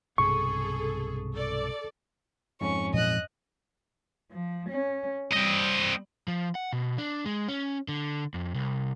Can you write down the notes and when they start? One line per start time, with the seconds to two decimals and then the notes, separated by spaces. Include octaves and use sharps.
0.18 B1 G2 C3 G#4 A4 C#6
1.35 A4 D5
2.61 F2 G#2 C#4 C#6
2.94 A#2 F3 F#3 D#5 F#6
4.31 F3
4.70 C#4
5.32 G3 C4 D#5
6.28 F3
6.55 F#5
6.73 B2
6.98 D4
7.26 G#3
7.49 C#4
7.88 D3
8.34 F2
8.55 C2